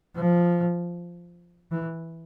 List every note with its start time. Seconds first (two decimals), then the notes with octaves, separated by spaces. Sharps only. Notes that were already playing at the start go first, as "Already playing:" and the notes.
0.15 F3
1.72 E3